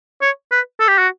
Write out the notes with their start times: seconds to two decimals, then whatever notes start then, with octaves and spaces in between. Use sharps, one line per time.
0.22 C#5
0.51 B4
0.80 A4
0.88 G4
0.99 F#4